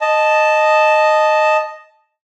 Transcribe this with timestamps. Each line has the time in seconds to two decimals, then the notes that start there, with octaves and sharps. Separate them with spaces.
0.01 D#5 A5